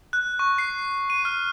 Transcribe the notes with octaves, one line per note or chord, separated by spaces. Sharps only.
F#6
C#6
C7
D#7
F6